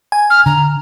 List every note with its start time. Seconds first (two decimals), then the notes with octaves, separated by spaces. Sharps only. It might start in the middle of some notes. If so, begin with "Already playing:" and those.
0.12 G#5
0.30 F6
0.46 D3 A#5